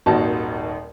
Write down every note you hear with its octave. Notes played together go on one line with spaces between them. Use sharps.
D#1 G#1 D#2 D#4 F#4 A5